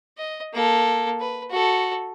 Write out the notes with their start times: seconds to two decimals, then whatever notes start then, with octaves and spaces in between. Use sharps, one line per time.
0.18 D#5
0.54 A#3 A4
1.21 B4
1.50 F#4 A4